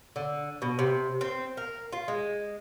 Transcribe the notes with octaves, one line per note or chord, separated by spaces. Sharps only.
D3
B2
C3
C4
A#4
F4
G#3